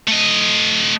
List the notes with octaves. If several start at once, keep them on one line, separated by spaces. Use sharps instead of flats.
A3 D#5